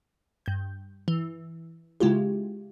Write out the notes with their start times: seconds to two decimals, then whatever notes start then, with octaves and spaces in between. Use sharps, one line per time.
0.46 G2 G6
1.08 E3
2.00 C#3 G#3 E4 F4 G4